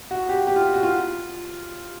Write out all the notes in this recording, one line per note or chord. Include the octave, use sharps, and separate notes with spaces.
F#4
G4
G4
F4
F#4
F4